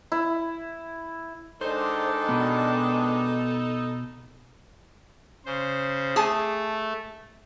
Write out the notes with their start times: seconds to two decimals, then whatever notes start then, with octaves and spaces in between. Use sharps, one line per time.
0.12 E4
1.61 D#3 G#3 D4 D#4 A4 C5
2.29 B2 B3
5.46 C#3 C5
6.16 A3 G#4 G#5 A5